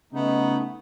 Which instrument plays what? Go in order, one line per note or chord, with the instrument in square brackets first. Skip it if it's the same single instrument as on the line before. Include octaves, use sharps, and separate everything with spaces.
[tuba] C#3 [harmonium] A3 D#4 [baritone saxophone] B3